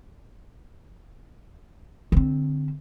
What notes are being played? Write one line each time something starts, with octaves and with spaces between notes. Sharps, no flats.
D3 C4